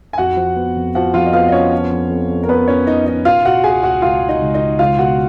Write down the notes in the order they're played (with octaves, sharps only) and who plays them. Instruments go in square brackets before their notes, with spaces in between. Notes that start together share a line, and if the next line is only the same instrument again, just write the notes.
[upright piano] G#5
[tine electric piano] F2 [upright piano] F#4 F#5
[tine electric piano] F3
B3
F2
[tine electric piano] F3 [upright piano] F#4 F#5
[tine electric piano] F2 [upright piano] F4 F5
[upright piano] D#5
[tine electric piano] B3 [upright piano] F4 F5
[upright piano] D#5
[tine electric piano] F3 [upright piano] C#4 C#5
[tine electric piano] F3
F2
F2
F2
[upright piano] A#4
[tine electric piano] F2 [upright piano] B3 B4
[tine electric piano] F3 [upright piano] C#4 C#5
[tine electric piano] F3 [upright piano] D#4 D#5
[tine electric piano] F2 [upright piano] D#4 D#5
[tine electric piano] B2 [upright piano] F4 F5
[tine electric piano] B2 [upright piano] F#4 F#5
[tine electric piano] C#2 [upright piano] G#4 G#5
[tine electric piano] C#2 [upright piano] F#4 F#5
[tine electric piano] C#2 [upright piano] F4 F5
[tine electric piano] C#2
[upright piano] D#4 D#5
[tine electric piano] C#2
[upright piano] D#4 D#5
[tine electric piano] C#2
[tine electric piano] C#2 [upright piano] F4 F5
[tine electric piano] B2 [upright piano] F#4 F#5